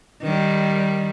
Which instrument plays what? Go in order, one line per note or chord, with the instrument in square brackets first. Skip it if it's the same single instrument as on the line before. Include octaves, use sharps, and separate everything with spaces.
[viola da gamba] D#3 G3